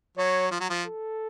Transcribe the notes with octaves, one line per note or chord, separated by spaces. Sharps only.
F#3 C#5
F3
F#3
F3
A4